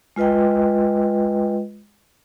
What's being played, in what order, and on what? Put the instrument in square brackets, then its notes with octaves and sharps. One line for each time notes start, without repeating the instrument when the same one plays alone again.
[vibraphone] G#3 F4 B4 D#5 G5